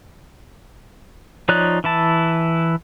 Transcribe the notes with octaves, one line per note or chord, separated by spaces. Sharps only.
F3 D#4 C#5 D5 F#6
E3 E4 A5